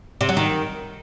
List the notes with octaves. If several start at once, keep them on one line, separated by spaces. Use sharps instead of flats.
C3
F#3
D#3